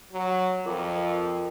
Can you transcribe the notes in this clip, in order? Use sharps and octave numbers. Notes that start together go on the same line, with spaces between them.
F#3
F2 F4 A#4 D6